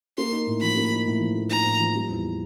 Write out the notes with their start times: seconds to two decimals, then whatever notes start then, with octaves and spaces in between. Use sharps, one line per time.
0.18 A#3 C6
0.32 D#4
0.47 A2
0.61 F3 B5
0.76 A#3
0.91 D#4
1.07 A2
1.21 F3
1.35 A#3
1.50 D#4 A#5
1.65 A2
1.80 F3
1.95 G3
2.10 E2